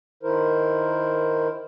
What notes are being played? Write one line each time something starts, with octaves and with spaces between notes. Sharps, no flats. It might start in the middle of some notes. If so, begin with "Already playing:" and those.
D#3 E4 A#4 C5